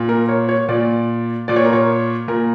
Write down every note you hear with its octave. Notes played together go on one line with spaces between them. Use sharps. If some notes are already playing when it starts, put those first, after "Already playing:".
Already playing: A#2
A#4
C#5
C#5
A#2 D5
A#2 D5
C#5
A#4
C#5
A#2 A#4